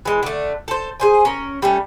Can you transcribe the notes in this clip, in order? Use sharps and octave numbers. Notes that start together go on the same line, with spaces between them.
E3 G#3
D3 A3
A4 C5
G#4 C5 G#5
C#4 A#4
G3 A3 C#4